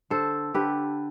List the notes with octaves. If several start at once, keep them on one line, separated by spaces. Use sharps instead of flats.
D3 A4 C5
D3 G4 B4